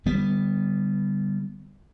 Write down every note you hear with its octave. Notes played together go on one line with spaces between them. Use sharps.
D3 G3 B3